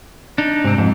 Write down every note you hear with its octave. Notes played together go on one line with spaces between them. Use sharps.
D4 D#4
G#2 C3 C4
F2 G#2